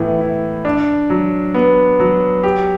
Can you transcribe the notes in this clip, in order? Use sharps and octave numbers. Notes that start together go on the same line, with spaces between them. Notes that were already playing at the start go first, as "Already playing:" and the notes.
Already playing: A2 E3 B3
E4
D4
F#3
B3
F#3
G4